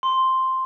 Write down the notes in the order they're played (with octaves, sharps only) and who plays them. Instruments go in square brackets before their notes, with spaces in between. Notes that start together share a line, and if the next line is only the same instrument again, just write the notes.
[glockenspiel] C6